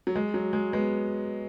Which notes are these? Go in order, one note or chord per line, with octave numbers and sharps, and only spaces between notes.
F#3
G#3
F#3
G#3
G#3 B3